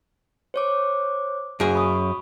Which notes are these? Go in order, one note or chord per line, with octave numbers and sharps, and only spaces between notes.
C5 C#5 D6
F#2 G#4 D7
B5 C#6 D#6